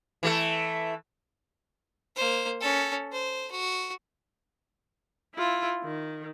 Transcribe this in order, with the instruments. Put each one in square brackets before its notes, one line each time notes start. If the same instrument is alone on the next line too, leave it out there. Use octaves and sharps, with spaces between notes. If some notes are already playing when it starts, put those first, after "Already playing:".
[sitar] E3 A3 A4
[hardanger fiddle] A#3 C5
C#4 A4
C5
F#4
[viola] E4 F4
D#3